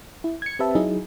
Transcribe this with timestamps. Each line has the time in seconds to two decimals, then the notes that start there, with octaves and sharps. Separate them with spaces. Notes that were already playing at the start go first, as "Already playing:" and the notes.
0.24 E4
0.42 G#6 C#7
0.59 C4 G4 B4 E5 A5
0.75 F#3 D#4 E4 G#4